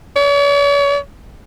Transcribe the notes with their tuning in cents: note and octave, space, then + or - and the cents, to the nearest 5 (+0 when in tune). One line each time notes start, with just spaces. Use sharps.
C#5 +45